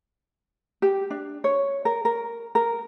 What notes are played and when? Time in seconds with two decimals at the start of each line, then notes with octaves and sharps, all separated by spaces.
0.82 G4
1.10 D4
1.44 C#5
1.85 A#4
2.05 A#4
2.55 A#4